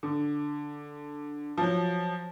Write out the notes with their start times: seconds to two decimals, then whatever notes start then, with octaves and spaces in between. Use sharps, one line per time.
0.03 D3
1.58 F3 F#3